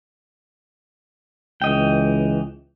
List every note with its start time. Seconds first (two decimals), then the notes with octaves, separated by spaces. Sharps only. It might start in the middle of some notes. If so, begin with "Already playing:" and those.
1.62 C#2 E3 D#5 G5